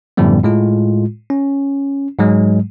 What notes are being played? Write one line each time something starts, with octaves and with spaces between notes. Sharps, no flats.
F#2 A2 D3 F3 G3 B3
A2 G#3 F4
C#4
G#2 F#3 G#3